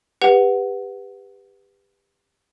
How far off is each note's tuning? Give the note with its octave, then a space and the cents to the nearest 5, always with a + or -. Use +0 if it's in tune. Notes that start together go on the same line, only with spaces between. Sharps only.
G4 +25 B4 +0 F#5 +0